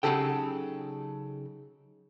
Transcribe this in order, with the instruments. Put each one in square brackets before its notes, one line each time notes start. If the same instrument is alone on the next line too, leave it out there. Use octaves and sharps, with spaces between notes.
[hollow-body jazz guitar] C#3 F#3 D#4 G4 A4 G5